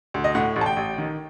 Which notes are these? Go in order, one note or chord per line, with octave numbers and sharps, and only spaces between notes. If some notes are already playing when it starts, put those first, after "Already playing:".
D2
D#5
A2 F#5
A1
A5
G5
A1
D#3